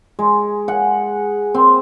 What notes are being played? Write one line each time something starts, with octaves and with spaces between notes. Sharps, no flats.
G#3
F#5
C4